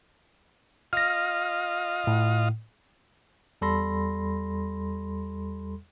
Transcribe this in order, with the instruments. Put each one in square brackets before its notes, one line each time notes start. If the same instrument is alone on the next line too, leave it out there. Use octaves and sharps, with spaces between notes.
[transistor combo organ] F4 D#5 F5 [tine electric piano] F6 A#6
[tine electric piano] A2
E2 G3 A4 B5 C6 A#6